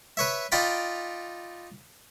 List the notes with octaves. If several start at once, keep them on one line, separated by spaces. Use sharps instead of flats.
B4 C#5 E5
D#4 F4 D5 G5 B5